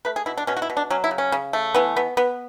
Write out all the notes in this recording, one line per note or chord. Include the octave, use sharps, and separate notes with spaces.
A3 B4
G#4
B2 E4
D4
B2 C#4
F#4
E4
B2
D4
F#3 C#4
E4
C#3
C#4
C#3
A3
E3 B3
B3
B3